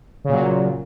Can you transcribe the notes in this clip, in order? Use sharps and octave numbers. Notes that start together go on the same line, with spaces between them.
A#2 C#3 F#3